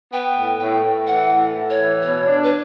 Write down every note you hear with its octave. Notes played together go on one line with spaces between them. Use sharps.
B3 G5
A2
A2 G5
A2
E3 F#5
A2
A2
C#5
E3
B2 C#5
D4
B4